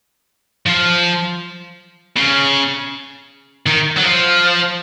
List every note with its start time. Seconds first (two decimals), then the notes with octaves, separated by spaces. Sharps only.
0.66 F3
2.16 C#3
3.66 D#3
3.97 F#3
4.03 F3